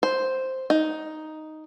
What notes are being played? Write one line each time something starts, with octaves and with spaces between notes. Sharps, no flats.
C5
D#4